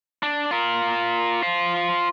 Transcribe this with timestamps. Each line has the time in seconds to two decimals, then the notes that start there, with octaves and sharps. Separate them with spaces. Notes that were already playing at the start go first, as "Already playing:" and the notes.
0.23 D4
0.51 F4 A#4
1.43 F4 C5